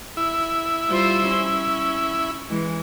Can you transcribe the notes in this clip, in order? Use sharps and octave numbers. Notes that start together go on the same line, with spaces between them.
E4
G3 F4 C5
C#4
E3 G#3